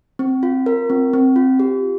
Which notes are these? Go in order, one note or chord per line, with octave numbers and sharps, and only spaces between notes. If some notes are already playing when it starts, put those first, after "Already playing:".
C4
F4
A#4
C4
C4
F4
G4